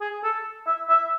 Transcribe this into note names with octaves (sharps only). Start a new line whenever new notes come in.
G#4
A4
E5
E5